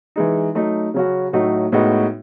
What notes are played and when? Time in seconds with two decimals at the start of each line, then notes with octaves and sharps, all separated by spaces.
0.16 E3 G#3 D#4
0.55 F#3 A3 D#4
0.94 C#3 F#3 C#4 F#4
1.33 A2 F#3 A3 D#4 F#4
1.72 A2 G#3 B3 D#4 F#4